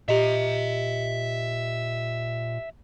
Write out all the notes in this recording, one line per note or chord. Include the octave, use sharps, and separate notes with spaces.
A#2 G4 D#5 E5 A#5